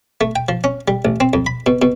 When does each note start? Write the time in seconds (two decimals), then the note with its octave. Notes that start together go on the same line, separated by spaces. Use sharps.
0.21 A3
0.36 G5
0.49 F3
0.64 C#4
0.88 G3
1.05 A1
1.20 C4
1.33 F2
1.46 B5
1.66 B2
1.82 B2